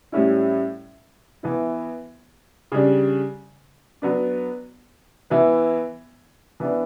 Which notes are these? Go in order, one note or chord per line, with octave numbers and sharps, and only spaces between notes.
A2 G3 C#4 E4
E3 B3 E4
C#3 G3 D4
F#3 B3 D4
E3 B3 E4
E3 B3 D4